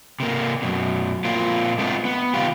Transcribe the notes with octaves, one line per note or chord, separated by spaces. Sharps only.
C3 A#3
F#2 B2
A#2 A#3 C4 F4
G#3 A3 B3 C4 D#4 F4
B3
C3 D#3 G3 F4 G4